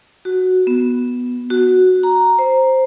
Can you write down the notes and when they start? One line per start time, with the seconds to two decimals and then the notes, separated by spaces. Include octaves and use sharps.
0.25 F#4
0.67 B3
1.50 F#4
2.03 A#5
2.38 C5